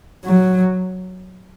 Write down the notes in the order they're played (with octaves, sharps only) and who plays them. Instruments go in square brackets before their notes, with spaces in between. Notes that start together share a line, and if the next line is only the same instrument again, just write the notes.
[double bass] F#3